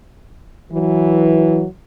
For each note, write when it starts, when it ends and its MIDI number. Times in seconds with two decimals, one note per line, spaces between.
0.72 1.64 52
0.72 1.64 54